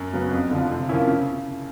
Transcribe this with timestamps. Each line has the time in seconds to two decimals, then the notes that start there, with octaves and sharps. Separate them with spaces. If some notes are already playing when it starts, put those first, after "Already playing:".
Already playing: F#2
0.13 C#3 F#3 B3
0.31 F2
0.51 D3 F3
0.70 C3
0.89 F3 A#3 C#4 E4
1.08 C#3